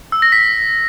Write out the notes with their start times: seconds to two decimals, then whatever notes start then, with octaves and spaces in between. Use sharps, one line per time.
0.12 E6
0.22 A#6
0.32 B6